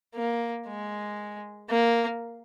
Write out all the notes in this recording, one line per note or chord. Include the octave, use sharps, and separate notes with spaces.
A#3
G#3
A#3